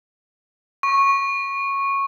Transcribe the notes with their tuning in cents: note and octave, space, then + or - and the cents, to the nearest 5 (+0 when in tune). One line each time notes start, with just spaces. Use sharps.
C#6 -10